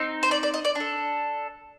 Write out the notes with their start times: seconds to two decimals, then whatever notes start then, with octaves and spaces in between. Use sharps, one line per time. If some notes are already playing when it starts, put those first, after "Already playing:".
Already playing: C4 D#4
0.23 C5
0.31 D5
0.43 D5
0.54 D#5
0.65 D5
0.75 D4 A4